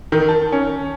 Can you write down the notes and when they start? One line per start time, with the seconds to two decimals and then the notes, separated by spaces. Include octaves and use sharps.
0.12 D#3
0.29 A5
0.52 C#4